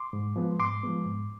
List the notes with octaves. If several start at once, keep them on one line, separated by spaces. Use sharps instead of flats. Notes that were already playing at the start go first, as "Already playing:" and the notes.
Already playing: C6 D6
G#2
F3 G#3 B3
G#2 C6 D6
F3 G#3 B3
G#2